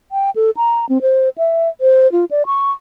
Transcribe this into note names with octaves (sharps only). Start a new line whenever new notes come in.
G5
A4
A#5
C4
C5
E5
C5
F4
D5
C#6